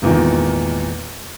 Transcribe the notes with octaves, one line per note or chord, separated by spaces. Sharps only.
G#1 E2 A#2 D#3